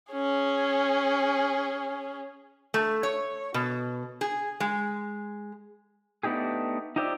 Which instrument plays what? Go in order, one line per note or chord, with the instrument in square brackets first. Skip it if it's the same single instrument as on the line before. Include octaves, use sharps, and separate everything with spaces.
[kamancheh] C#4 G#4
[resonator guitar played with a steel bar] A3
C#5
B2
G#4
G#3
[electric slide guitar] A3 B3 D4 D#4 G4 G#4
D#4 F4 G4 C5 D5 E5